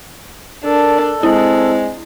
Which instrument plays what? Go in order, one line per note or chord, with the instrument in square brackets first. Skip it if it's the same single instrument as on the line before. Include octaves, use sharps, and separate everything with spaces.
[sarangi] D4 [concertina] A4 [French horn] A#4
[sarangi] G#3 [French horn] C4 [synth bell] E4